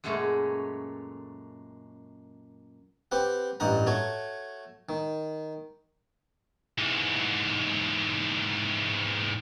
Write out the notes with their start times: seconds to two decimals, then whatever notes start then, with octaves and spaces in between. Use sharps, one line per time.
0.04 F#2 A#2 G#3 A3 C#4
3.12 C4 G4 B4 F#5
3.60 A1 G2 D#5 F#5 A#5
3.87 A3 F#4 C#5
4.89 D#3
6.78 G#2 E3